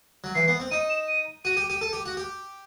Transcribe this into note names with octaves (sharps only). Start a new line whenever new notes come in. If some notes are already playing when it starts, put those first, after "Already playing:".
F#3
E3 C7
B3
C4
D#4 D#7
E7
D#7
F#4 D#7
G4
G4
A4
G4
F#4
G4